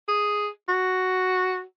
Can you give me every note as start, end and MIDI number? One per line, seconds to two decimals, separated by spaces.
0.08 0.49 68
0.68 1.62 66